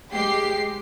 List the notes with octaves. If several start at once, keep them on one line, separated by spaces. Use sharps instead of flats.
G#3 G4 C7